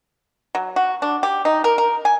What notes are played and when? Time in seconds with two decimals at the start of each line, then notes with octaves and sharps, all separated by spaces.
0.55 F#3
0.76 F#4
1.02 D4
1.23 G4
1.45 D#4
1.64 A#4
1.78 A#4
2.05 G#5